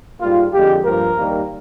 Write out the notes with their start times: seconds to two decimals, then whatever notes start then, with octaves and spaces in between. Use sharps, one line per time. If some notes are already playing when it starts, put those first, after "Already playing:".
0.21 G#2 G3 A#3 F4
0.53 F2 D3 G#3 G4
0.85 G2 F3 A#3 A#4
1.16 D#2 D#3 G3 A#3